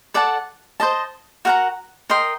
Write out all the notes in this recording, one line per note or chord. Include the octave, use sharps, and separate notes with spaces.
A4 D5 F#5 A5
C5 D#5 A5
F#4 A#4 F#5 A#5
A#4 D#5 G5 C6